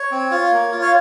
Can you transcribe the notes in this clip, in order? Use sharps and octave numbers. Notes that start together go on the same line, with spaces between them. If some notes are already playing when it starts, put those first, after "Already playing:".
Already playing: C#5
C4
F4
A#3
F4
C#5